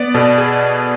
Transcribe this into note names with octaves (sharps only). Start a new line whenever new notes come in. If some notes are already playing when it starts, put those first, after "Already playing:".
Already playing: B3 D5
B2 A4
G#4